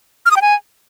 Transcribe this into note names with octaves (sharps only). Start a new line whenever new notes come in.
F6
D#6
G5
G#5